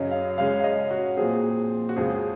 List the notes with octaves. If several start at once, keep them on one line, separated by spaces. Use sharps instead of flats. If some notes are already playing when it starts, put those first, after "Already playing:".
Already playing: F#2 C#3 C#4 D#5
F5
C#3 G#3 C#4 F5
F5
D#5
F#4
A#2 F3 C4 G#4
F#4
F2 C#3 F3 G#3 G#4